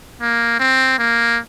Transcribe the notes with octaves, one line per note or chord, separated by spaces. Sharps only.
A#3
C4
A#3